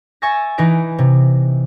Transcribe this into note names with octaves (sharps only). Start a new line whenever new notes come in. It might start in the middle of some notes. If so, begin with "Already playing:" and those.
E5 G#5 C#6 E6 A6 A#6
E3 D#4 B4 A#6 D7
C3